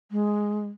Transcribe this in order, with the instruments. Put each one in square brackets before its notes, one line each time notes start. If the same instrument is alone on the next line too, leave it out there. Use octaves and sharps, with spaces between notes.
[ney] G#3